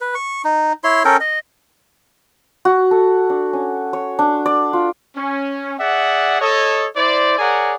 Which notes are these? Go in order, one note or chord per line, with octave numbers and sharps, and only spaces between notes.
B4
C#6
D#4
E4 C#5 C6
C#4 A4 A#4 G5
D#5
F#4
A4
D4
C#4
C#5
D4
D5
F4
C#4
G#4 D5 E5 F#5
A4 C#5 D#5
E4 C5 D5
G#4 A#4 C#5 D5 F#5 G#5